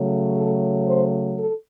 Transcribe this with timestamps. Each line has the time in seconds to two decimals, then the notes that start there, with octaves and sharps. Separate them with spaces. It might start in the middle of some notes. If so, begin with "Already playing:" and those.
Already playing: C#3 F#3 A3
0.36 A4
0.87 C5
1.38 A4